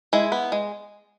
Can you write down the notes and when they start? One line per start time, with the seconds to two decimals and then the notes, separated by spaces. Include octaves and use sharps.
0.13 G#3 E4
0.32 B3
0.52 G#3